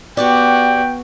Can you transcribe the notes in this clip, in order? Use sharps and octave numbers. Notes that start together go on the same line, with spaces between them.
B3 F#4 G4 C#5 D5 G5